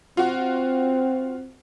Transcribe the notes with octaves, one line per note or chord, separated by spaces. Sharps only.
C4 F4 F#4